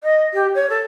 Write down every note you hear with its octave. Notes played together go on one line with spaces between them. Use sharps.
D#5
G4
C#5
A4